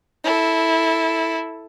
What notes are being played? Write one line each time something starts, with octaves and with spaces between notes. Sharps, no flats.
E4 A4